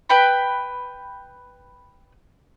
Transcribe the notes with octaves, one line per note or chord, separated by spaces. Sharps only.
B4 G5 B5